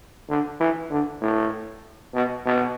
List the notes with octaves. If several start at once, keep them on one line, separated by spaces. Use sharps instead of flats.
D3
E3
D3
A2
B2
B2